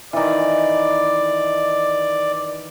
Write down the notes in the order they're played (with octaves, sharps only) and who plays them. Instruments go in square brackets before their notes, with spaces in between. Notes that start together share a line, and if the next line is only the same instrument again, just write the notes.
[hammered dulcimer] D#3 E3 [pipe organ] D5